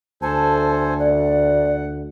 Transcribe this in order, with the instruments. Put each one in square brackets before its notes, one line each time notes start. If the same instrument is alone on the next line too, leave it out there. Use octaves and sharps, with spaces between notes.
[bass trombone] D2 [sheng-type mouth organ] A4 C5 G#5 [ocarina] A5
[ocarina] D5 [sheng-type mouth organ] F#5